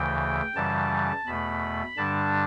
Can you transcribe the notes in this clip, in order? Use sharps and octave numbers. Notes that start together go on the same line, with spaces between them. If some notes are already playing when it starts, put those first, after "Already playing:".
Already playing: D2 C#3 E3 G5
F#2 C#3 E3 G3 A5
E2 B2 A3 B5
G2 D3 G3 D4 A5